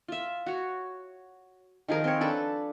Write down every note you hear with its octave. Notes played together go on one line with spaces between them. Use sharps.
F4 E5
F#4 C#5
D#3 F3 G#4 A#4
C4 C#5
D4 A4 B4